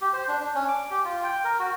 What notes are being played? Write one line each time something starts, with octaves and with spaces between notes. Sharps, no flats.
G4
C5
D4
D4
C#4
D6
G4
F4
G5
A#4
F#4